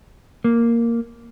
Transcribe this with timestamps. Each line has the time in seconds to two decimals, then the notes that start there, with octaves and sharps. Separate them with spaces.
0.44 A#3